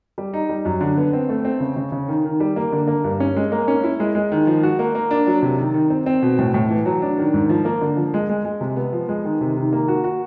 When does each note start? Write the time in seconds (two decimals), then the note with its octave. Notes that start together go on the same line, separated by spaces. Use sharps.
0.18 G3
0.34 D#4
0.49 G3
0.65 F#2
0.81 D3
0.98 B3
1.13 C4
1.29 A3
1.45 C4
1.60 C#3
1.76 C#3
1.92 C#3
2.08 D#3
2.25 D#3
2.40 G3
2.56 A#3
2.72 D3
2.87 A#3
3.04 G2
3.20 C#4
3.36 G#3
3.52 A#3
3.68 C#4
3.84 E4
4.00 G#3
4.15 G#3
4.32 D#3
4.47 F3
4.63 F#4
4.79 A#3
4.95 A#3
5.11 D4
5.27 F#3
5.43 C3
5.58 D#3
5.74 D#3
5.90 C4
6.06 C4
6.22 B2
6.39 A2
6.54 A2
6.70 E3
6.86 F#3
7.02 D4
7.18 D#3
7.34 G#2
7.50 F3
7.65 A#3
7.81 D3
7.97 F3
8.14 G#3
8.29 G#3
8.45 G#3
8.61 C3
8.77 B3
8.93 F3
9.09 G#3
9.25 D#3
9.41 C3
9.56 D#3
9.73 A#3
9.88 F#4
10.04 F#4